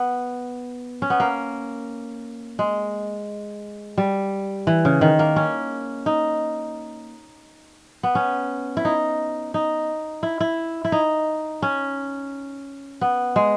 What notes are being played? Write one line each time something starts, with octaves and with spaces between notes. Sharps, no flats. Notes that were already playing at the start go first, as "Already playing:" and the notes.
Already playing: B3
C#4
B3
A#3
G#3
G3
E3
C#3
D#3
A#3
C#4
D#4
B3
C#4
E4
D#4
D#4
E4
E4
E4
D#4
C#4
B3
G#3